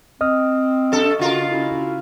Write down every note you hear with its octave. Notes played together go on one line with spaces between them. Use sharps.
C4 D#5 D#6 F6
F#2 A4
C#3 F4 F#4 A#4
C#4 E4 F#4